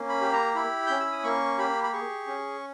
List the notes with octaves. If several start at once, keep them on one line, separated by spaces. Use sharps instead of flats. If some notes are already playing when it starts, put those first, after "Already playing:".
Already playing: A#3 C#4
B5
G4
A#5
E4 B5
C#4 G6
E6
D#6
A#3 C#6
G4 B5
B5
G#4 C#6
C#4